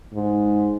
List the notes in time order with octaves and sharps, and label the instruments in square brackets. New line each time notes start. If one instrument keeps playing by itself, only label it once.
[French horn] G#2